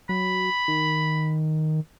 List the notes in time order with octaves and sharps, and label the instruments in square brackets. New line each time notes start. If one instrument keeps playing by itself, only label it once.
[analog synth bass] F#3 [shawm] B5
[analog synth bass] D#3